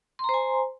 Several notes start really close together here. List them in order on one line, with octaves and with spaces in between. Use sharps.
C6 A#5 C5 G#5